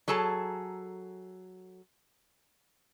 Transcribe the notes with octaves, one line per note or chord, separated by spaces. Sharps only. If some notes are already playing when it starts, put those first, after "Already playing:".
F#3 G#4 A4 A5 A#5